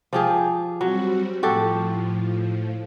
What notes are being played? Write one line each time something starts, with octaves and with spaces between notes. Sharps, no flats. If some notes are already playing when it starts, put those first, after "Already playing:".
F3 G4 G#4
F#3 G3 C4 F#4
A2 F3 F#4 G4 A4